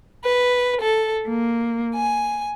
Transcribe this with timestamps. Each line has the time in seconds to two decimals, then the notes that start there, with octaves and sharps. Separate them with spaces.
0.25 B4
0.83 A4
1.28 A#3
1.96 G#5